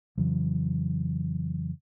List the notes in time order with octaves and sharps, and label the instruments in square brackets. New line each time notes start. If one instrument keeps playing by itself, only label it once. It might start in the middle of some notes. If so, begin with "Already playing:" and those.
[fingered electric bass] F2 C#3 E3 F#3